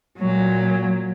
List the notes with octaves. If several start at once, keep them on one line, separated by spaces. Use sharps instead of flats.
A#2 F#3